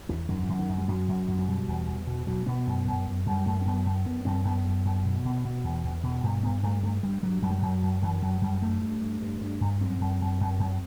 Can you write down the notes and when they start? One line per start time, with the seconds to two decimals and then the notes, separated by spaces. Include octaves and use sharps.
0.09 E2 E3
0.29 F#2 D#3
0.44 E3
0.49 F#2
0.59 D#3
0.69 F#2
0.78 G3
0.88 F#2 F#3
1.08 F#2
1.28 F#2
1.39 F#3
1.48 B2 G3
1.68 E2
1.87 E2
2.07 B2
2.27 B2 F#3
2.46 B2 B3
2.67 F#2
2.87 F#2
3.06 F#2
3.26 F#2 G3
3.46 F#2 A3
3.61 C4
3.66 F#2 B3
3.86 F#2
4.06 F#2 B3
4.25 F#2 C4
4.45 F#2 B3
4.65 F#2
4.85 F#2
5.05 B2
5.25 B2
5.44 B2
5.64 E2
5.84 E2
6.03 B2
6.24 G2 B3
6.43 G2 B3
6.63 G2 A3
6.83 G2 A3
7.03 G2 G3
7.23 G2 F#3
7.42 F#2 F#3
7.51 G3
7.58 F#2 F#3
7.82 F#2
8.02 F#2 E3
8.22 F#2 F#3
8.42 F#2 G3
8.62 G2 A3
8.82 G2
9.01 G2
9.22 G2
9.41 G2
9.61 G2
9.81 F#2 C4
10.00 F#2
10.21 F#2
10.41 F#2
10.60 F#2